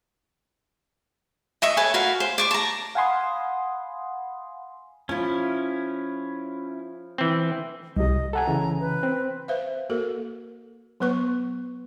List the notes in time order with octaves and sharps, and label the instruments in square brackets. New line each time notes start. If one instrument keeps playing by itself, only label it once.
[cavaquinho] D#5 E5 C#6
A4 B4 C#5 G#5
F#4 A#4 B4 F5
C5
D5 C#6 D6
A5 A#5
[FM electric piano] F5 F#5 G#5 B5 C6 D#6
[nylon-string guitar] F3 F4 [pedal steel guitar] C#4 E4
[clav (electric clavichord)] E3 C4
[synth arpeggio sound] C2 C3 [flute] D#5
[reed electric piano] A4 F#5 G#5 [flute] A#5
[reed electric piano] C#3 E3
[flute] B4
[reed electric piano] C4
[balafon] B4 C5 E5 F5
A#3 F#4 A4 A#4
F#3 B3 B4 C#6